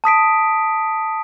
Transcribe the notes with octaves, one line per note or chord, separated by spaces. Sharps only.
A5 D#6 B6 D7